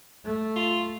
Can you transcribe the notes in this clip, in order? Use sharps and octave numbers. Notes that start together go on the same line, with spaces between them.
A3
F4